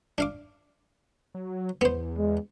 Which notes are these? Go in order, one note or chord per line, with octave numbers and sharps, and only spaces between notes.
D4 F5 D6
F#3
E2 B3 C5
G#3